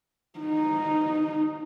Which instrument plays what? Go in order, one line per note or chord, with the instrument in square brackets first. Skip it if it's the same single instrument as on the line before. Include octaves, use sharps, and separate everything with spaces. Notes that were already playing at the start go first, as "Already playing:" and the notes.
[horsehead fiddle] D#4